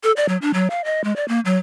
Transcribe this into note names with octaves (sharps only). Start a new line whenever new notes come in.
A4
D5
F#3
D4
F#3
F5
D#5
G#3
D5
A#3
F#3